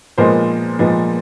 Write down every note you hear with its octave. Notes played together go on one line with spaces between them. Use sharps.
A#2 F3 G#3 B3 A#4 C5
A#2 F3 G#3 B3